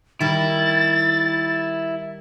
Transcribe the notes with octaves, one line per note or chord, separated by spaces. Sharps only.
D#3 G3 E4 A6